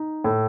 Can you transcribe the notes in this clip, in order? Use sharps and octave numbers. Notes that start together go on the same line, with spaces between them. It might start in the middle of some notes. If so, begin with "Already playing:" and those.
Already playing: D#4
A2